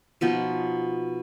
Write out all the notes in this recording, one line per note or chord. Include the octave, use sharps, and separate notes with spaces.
B2 F3 B3 D#4